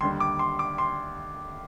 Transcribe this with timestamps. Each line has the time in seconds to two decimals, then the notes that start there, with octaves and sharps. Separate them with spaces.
0.01 D#2 D3 G3 C6
0.20 D6
0.39 C6
0.59 D6
0.78 C6